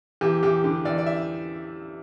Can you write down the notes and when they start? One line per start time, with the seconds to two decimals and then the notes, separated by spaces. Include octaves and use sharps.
0.21 E2 G4
0.43 E2 G4
0.64 D3 G4
0.85 E2 D5
0.98 D5
1.06 E5